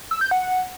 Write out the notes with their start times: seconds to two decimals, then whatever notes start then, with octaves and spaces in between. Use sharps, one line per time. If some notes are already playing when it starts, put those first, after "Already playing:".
0.11 E6
0.21 G6
0.31 F#5